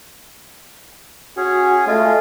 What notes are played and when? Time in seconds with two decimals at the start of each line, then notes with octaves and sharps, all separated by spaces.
1.37 C#4 F#4 G#4
1.87 G#3 A3 F4